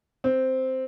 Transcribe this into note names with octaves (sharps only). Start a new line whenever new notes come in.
C4